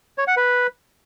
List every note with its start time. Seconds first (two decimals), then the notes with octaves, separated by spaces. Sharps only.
0.18 C#5
0.27 F#5
0.37 B4